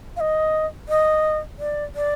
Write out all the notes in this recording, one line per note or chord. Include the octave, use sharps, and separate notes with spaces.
F5
D#5
D#5
D5
D5